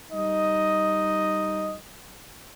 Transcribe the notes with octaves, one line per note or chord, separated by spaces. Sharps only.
G3 D#4 D#5